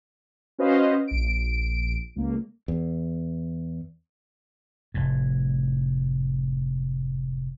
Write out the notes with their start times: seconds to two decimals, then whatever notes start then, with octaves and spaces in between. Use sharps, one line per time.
0.58 C#4 F#4 B4 C5 D#5 F5
1.08 A#1 D7
2.16 C#2 A#3
2.68 E2
4.94 F1 A2